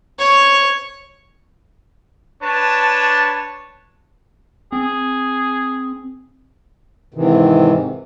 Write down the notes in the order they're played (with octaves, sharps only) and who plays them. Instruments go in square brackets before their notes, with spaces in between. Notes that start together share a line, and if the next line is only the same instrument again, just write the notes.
[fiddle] C#5
[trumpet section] D4 B4 C#5 A5
[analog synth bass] C4 [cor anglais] G#4
[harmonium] G#2 C3 D#3 E3